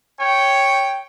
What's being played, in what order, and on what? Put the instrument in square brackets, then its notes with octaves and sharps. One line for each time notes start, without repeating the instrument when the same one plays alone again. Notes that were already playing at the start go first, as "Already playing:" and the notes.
[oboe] C#5 [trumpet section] G5